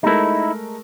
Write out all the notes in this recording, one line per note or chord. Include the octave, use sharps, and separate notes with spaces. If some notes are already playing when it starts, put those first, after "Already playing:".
G#3 A3 D#4 E4 A#4